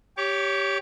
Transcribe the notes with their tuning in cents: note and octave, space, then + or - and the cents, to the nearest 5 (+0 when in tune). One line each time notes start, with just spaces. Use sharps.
G4 +0 C#5 +10 D6 -40